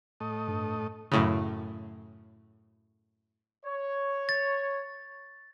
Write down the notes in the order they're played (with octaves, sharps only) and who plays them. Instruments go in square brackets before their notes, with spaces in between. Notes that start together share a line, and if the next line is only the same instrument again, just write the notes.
[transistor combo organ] A2 A3 D#5
[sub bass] G2
[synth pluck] F#2 A2 C#3
[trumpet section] C#5
[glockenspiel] A6